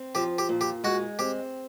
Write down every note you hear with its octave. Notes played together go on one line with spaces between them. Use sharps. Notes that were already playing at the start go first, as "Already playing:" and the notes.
Already playing: C4
F3 G4
G4
A#2
G4
G#3 F#4
C4 G4